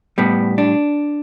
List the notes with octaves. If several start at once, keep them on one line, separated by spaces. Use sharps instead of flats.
A2 G3 B3
D4